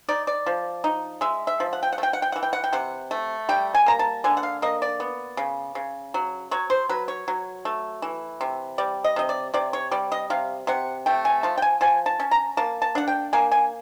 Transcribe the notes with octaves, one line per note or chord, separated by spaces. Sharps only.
D#4 D5
D5
F3
D#4
G#3 E5
E5
F3
F#5
G5
F#5
A3
G5
F#5
G5
E3 F#5
G5
F#5
G5
C3 F#5
A3
G3 G5
G#5
A#3 A#5
A5
D3 G#5
F#5
F5
A#3 D#5
D5
B3
C#3
C#3
F#3
F#3 C#5
C5
F#3 B4
C#5
F#3
A3
E3
C3
G3 D5
D#5
C3 D#5
D5
C3 D5
C#5
G3 D5
D#5
C3 F5
C3 F#5
A3 G5
G#5
F3 A5
G5
G#5
F3 G#5
A5
C#4
A#5
A#3 A5
A5
D4 F#5
G5
A#3 G#5
G#5